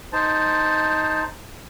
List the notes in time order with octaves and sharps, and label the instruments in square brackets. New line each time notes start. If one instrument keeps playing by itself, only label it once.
[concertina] D#4 C5 A5